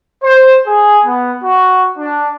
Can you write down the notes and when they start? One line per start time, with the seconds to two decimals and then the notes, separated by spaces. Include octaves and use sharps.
0.24 C5
0.67 G#4
1.05 B3
1.44 F#4
1.98 D4